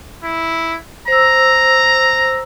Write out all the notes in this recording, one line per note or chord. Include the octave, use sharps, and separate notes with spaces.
E4
C5 A#5 E6